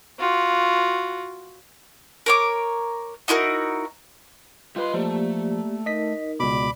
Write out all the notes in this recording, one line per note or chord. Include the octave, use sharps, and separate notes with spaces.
F4 F#4
A#4 C#5 D6
D#4 E4 F#4 A#4
G3 F4 B4 D#5 C6
F3 A3 A#3 G4 D5
D#4 A#4 D#5 B6
C#2 B2 D5 B5 D6